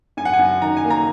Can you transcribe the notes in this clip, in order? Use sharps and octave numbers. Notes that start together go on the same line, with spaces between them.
F#2 G#5
F#5
G#5
F#2
D#3 A#5
G#5
A#3
A#5